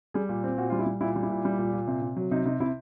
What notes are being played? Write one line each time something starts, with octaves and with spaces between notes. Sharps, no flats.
G3 G#4
A#2
C4
A#2 F#4
G3 F4
E4
G3
A#2 E4
G3
E4
A#2
G3
A#2
A#2
C3
C3
F#3
C3 D#4
C3 D#4
C3 E4